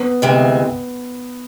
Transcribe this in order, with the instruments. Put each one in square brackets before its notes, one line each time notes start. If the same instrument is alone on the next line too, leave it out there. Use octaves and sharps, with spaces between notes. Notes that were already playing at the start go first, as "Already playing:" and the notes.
Already playing: [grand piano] B3
[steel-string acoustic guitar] D2 C3 E3 G#3